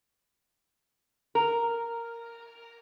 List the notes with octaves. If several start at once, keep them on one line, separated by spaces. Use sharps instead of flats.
A#4